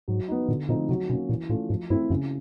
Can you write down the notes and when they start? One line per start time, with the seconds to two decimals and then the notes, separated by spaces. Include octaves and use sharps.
0.08 G#2 F#3
0.28 B3 D#4
0.48 A#2 D3
0.69 A#2 F3 A3 C4 D#4
0.89 C3 F#3
1.09 B2 C#4
1.13 A#3
1.29 A#2 E3
1.49 A2 A3 C#4 F4
1.69 G#2 F3
1.90 G2 A3 C4 E4
2.10 F#2 C#3